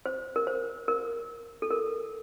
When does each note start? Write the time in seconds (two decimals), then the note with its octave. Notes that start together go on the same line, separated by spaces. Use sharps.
0.06 C5
0.36 A#4
0.47 C5
0.88 A#4
1.62 A4
1.71 A#4